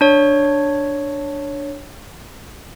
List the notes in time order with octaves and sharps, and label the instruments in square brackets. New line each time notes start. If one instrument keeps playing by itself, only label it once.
[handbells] D4 C#5